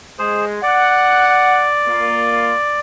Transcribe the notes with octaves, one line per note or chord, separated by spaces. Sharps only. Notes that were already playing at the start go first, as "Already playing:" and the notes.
G#3 G#4 C5
D5 F#5
A#3 F4